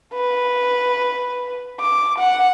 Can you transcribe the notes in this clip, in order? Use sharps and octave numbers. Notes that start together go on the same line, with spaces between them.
B4
D6
F#5